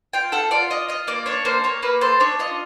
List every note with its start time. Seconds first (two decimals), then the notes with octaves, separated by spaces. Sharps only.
0.13 F4 G5
0.32 A4 F#5
0.51 F4 D5
0.70 F4 D#5
0.89 F4 D#5
1.07 A#3 D5
1.26 D4 C#5
1.45 A#3 C5
1.64 A#3 C#5
1.82 A#3 B4
2.01 A4 C5
2.20 D4 C#5
2.39 F4 D#5